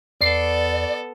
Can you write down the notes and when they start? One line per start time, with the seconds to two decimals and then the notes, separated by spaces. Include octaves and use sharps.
0.21 E2 B3 A4 D5 C7